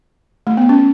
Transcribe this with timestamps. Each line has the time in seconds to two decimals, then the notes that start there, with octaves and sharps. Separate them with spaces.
0.47 A3
0.57 B3
0.69 C#4